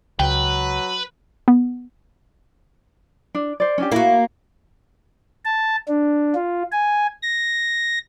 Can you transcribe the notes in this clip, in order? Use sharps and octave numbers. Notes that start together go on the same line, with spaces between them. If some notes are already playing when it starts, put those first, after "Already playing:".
C#2 F#3 B4 G5
B3
D4
C5 D5
C#4 D4 G4
A#3 E4 F#4
A5
D4
F4
G#5
A#6